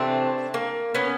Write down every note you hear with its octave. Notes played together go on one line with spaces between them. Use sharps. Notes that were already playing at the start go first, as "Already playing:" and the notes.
Already playing: C3 E3 A3 C4 D4
A#3
B3 C#4